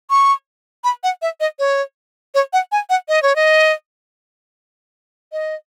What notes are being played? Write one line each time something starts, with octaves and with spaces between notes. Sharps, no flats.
C#6
B5
F#5
E5
D#5
C#5
C#5
F#5
G#5
F#5
D#5
C#5
D#5
D#5